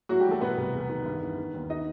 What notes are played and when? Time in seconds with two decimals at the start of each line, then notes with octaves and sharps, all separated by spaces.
0.09 A2 F#3 F#4
0.20 G3 G4
0.25 E3
0.31 A3 A4
0.41 B2 B3 B4
0.58 C2
0.73 E2
0.89 D#3
1.06 G2
1.22 E3
1.38 D#3
1.54 D#2
1.70 D#4 D#5